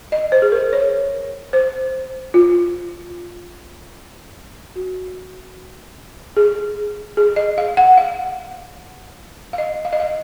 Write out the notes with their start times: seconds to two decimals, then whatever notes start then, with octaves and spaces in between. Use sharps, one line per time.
0.12 D#5
0.32 C5
0.42 G#4
0.52 A#4
0.73 C#5
1.53 C5
2.34 F4
4.76 F#4
6.37 G#4
7.17 G#4
7.36 D#5
7.58 F5
7.77 F#5
7.97 F5
9.53 F5
9.58 D#5
9.85 F5
9.93 D#5
10.00 F5